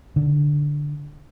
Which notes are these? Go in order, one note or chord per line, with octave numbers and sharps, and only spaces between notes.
D3